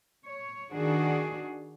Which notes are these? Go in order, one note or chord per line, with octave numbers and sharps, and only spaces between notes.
C#5
D#3 D4 F#4 G#4